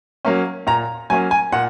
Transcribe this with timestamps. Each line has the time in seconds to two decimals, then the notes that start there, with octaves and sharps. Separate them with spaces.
0.25 F#3 A#3 C#4
0.67 A#2 A#5
1.10 F#3 A#3 C#4 G#5
1.31 G#5
1.52 A#2 F#5